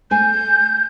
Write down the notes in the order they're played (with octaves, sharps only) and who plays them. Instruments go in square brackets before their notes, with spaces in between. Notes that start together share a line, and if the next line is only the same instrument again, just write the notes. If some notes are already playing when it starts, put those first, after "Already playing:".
[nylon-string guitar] A3 G#5 [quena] G6